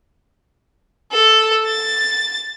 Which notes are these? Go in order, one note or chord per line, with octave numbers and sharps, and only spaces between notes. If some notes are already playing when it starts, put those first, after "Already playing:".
A4
A6